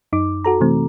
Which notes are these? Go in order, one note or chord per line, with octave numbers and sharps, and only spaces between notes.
F#2 D#4 D6
F#4 A4 A#5
C3 E3 A3 C4